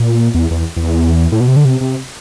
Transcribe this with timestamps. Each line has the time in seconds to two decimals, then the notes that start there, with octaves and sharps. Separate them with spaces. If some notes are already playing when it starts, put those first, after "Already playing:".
Already playing: A#2
0.34 E2
0.51 E2
0.77 E2
1.32 A2
1.40 B2
1.48 C3
1.56 D3
1.65 C3
1.81 C3